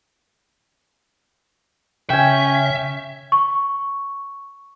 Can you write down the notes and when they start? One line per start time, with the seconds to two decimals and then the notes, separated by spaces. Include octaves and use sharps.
2.10 C#3 C#4 E5 G5 G#5
3.32 C#6